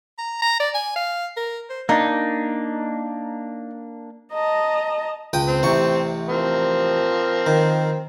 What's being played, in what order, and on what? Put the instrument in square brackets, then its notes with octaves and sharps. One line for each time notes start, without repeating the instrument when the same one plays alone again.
[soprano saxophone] A#5
A#5
D5
G#5
F5
A#4
C5
[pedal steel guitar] A#3 D4 [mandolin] D#4
[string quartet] D#5 A5 A#5
[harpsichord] C#2 G5 D#6
[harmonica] C4
[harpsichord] A1 C3 C#6
[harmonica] F3 C4 A#4
[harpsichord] D#3